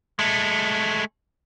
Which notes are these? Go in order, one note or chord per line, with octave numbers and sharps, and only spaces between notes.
G#3 A3